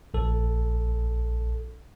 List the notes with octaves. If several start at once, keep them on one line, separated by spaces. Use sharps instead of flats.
A#1 A4